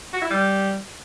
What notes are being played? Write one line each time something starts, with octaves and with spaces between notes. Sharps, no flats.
F#4
E4
G3